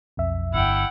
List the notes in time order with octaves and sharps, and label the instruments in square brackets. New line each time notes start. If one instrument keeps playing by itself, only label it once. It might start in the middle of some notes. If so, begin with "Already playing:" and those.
[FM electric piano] B1 F2 E5
[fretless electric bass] G1 [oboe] E4 [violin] F#5 G5